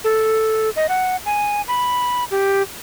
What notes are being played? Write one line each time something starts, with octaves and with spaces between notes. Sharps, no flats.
A4
D#5
F#5
G#5
B5
G4